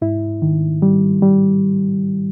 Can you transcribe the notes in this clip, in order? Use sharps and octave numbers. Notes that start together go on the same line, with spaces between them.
G#2 E4
D#3
G3
G3